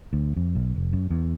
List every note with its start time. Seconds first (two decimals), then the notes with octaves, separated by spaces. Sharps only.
0.13 D2
0.36 F2
0.55 B1
0.76 F1
0.93 F#2
1.10 E2